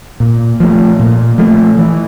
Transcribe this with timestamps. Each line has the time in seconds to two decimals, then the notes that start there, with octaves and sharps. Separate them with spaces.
0.20 A#2
0.60 F3 A3
0.99 A#2
1.38 F3 A3
1.78 E3